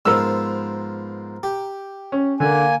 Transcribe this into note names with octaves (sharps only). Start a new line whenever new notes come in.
G#2 F3 B3 A#4 E6
G4
C#4
D3 A#3 G#5